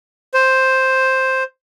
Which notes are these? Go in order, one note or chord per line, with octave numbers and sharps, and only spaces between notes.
C5